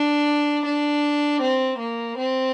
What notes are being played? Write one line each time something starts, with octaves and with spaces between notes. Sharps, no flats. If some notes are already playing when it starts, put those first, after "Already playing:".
Already playing: D4
D4
C4
A#3
C4